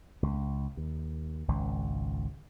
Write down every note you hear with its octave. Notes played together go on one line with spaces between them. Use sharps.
C#2
D#2
G#1 C#2